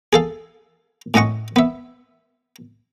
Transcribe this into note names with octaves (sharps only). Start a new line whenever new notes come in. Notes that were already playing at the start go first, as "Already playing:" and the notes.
G#4 A4 F5
A2 C#4 D#5 F#5 C#6
B3 E5